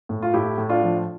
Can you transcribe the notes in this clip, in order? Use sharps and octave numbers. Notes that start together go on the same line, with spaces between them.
A2
F4
A2 E4 G4
A2
D4 F4
F3